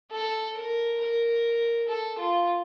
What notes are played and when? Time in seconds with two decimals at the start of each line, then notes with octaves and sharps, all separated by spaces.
0.12 A4
0.57 A#4
1.01 A#4
1.89 A4
2.19 F4